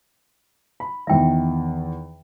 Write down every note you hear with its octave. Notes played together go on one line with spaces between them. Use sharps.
B5
E2 D#3 E5 G5